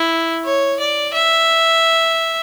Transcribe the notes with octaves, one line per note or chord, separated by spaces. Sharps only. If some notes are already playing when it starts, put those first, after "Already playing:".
Already playing: E4
C#5
D5
E5